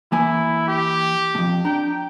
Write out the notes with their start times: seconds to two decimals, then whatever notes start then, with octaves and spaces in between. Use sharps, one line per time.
0.12 E3 A#3 E4 G#5
0.68 G4
1.35 F2 A2
1.65 D4 G5 A#5